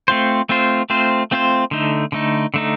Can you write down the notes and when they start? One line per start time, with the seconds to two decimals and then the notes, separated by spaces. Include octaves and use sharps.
0.08 A3 C4 F4 C5
0.49 A3 C4 F4 C5
0.90 A3 C4 F4 C5
1.31 A3 C4 F4 C5
1.71 D3 A3 D#4
2.12 D3 A3 D#4
2.54 D3 A3 D#4